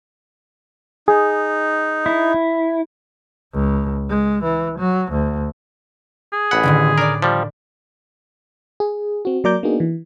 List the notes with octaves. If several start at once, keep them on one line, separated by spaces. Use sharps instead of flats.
D#4 G#4
E4
C#2
G#3
E3
F#3
D2
G#4
A1 F#5 B5
A2 D3 D#3
D4 A#4 D5
F3 G3
G#4
C4 F#4
F#3 A#3 D5 A#5 D6 G6
A#3 B3 D4 D#4 F#4 G#4
E3